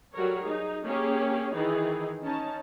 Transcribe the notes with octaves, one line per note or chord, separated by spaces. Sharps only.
F#3 G3 F#4 A4 A#4 C#5
D#4 G#4
A#3 C#4 G4 G#4 C#5
D#3 E3 D#4 E4 G#4
C#4 D#4 A5